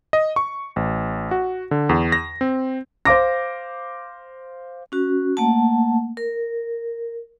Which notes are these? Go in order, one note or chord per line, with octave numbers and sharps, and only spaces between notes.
D#5
C#6
A1
F#4
D3
E2
A#6
C4
C5 F5 D6 A#6
C#4 F#4
A3 A#3 F#5 A5
A#4